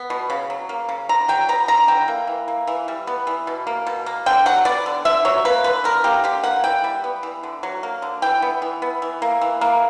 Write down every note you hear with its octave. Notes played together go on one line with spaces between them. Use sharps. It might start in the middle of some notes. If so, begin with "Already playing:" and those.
Already playing: B3
B2
C#3
F#3
A#3
C#3
D3 A#5
F#3 G5
B3 A#5
D3 A#5
E3 G5
A#3
E3
A#3
E3
G3
B3
E3
B2
A#3
B2
A#3
D3 G5
F#3 F#5
B3 D5
D3
D3 E5
F#3 C#5
A#3 B4
D3 B4
D3 A#4
A#3 G4
D3 G4
A#3 F#5
E3 G5
G3
B3
E3
D3
F#3
A#3
D3
E3 G5
B3
E3
B3
E3
A#3
E3
A#3